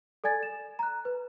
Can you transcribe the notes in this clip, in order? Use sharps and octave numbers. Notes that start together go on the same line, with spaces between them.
A4 D5 G#5 G#6 A6
E7
A#5 F#6
B4